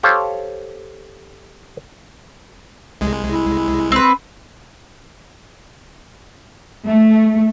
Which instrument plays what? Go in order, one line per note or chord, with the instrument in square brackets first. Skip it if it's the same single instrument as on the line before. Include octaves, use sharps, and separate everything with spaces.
[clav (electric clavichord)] G4 A4 C5 C#5 F5
[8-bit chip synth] C2 G#3
[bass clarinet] E4
[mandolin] C4 B4
[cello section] A3